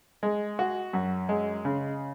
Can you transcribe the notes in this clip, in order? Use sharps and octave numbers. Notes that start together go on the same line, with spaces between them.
G#3
F#4
F#2
G#3
C#3